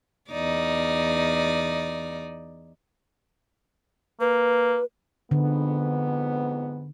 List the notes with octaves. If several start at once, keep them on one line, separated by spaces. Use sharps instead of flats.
E2 D#4 D5
A#3 B4
F2 G#2 D3 B3